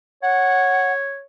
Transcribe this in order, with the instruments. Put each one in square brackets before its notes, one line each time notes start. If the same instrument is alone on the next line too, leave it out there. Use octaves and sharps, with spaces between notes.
[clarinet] C#5 [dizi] F#5